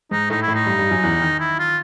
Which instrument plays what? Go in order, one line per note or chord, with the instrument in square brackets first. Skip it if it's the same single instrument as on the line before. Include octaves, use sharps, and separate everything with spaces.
[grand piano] G#2 G#3 [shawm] D#4
[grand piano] A2 A3 [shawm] D#4
[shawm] E4
[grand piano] A2 A3
[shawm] D#4
[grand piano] G2 G3
G2 G3
F#2 F#3
E2 E3
D#3
[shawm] E4
F4